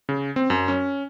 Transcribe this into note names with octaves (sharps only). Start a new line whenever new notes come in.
C#3
C4
F#2
C#4